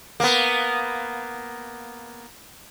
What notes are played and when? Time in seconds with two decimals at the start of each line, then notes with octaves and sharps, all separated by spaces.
0.20 A#3 B3